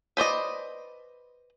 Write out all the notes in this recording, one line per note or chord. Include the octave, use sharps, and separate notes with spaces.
B4 C5 D5 D#5